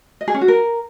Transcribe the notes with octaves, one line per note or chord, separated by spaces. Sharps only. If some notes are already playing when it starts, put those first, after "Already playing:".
D#5
G#4
C#4
F#4
A#4